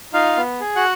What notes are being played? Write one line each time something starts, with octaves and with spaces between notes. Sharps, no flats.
D#4 F4 F5
B3
G#4
F#4 F#5